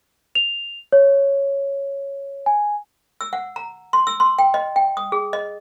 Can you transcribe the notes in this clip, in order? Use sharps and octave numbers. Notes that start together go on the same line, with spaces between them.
F7
C#5
G#5
E6
F#5
A#5
C6
E6
C6
G5
D#5
G5
D#6
G#4
D#5